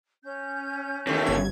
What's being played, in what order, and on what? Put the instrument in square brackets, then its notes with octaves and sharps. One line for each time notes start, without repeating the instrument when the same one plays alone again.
[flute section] C#4 G6
[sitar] D#2 A3 [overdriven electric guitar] C#3 E3
[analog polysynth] G1 G#6